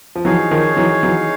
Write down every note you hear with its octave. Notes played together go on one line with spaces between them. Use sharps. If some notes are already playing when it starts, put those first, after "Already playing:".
F3
E3 F#3 D#4 G#4 C#5 F5
D#3 F3
E3 F#3
E3 F#3